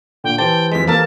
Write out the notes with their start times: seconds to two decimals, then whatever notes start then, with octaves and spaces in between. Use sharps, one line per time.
0.24 A#2 D3 G5
0.38 E3 G4 C5 G5 A5
0.72 F2 G#3 B6
0.88 A#3 A4 A#4 A5